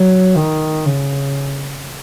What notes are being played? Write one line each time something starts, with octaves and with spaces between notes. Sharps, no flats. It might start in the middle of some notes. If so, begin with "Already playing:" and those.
Already playing: F#3
D#3
C#3